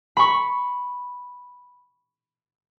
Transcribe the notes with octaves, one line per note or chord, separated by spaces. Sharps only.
B5 C#6